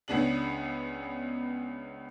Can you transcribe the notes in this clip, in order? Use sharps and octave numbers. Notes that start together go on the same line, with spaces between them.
C#2 B3 C#4 D4 G#4 F#7